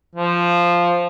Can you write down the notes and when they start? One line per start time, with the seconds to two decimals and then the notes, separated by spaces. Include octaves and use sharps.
0.15 F3